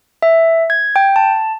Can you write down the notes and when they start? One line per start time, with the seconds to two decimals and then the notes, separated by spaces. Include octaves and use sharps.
0.22 E5
0.70 G#6
0.96 G5
1.16 A5